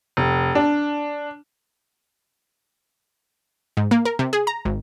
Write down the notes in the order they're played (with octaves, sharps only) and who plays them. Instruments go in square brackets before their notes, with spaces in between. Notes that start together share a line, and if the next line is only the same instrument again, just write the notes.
[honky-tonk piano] F1
D4
[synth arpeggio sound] G#2
A#3
A#4
C3
G#4
A#5
G#1